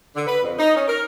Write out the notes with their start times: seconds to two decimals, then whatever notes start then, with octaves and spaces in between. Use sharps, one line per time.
0.14 D3
0.27 B4
0.43 F2
0.59 D#4
0.75 C#4
0.88 A#4